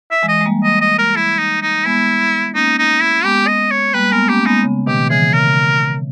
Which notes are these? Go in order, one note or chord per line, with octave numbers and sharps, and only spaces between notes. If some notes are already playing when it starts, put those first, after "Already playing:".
E5
E3 G#3
D#5
G#3
G3 A#3
D#5
D#5
A#4
E4
D#4
D#4
G#3 B3 E4
A#3 C#4 D#4
D#4
E4
G#3 B3 G4
D#5
C#5
G3 A#3 B4
G#3 B3 A#4
A#3 C#4 G4
G#3 B3 D#4
C#3
B2 D#3 G4
C#3 E3 G#4
C#3 A#4